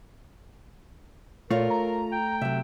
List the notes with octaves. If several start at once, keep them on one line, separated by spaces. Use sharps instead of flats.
A#2 A3 F4 A#4 C#5
A#5
G5
C3 F#3 E5